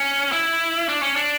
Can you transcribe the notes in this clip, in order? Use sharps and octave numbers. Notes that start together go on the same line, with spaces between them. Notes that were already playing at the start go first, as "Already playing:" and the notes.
Already playing: C#4
E4
D4
C#4
D4